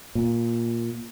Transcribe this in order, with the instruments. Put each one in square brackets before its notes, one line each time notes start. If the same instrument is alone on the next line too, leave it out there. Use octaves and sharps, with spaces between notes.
[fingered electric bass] A#2